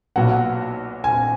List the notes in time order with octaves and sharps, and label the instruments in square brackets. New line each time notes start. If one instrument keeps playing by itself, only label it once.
[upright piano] B1 A#2 F#3 B3 F#4 [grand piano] F#5
[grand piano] G#5